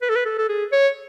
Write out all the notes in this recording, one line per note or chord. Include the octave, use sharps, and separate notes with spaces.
B4
A4
B4
A4
A4
G#4
C#5